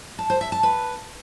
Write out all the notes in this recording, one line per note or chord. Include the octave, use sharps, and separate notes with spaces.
A5
C5
E5
A5
B4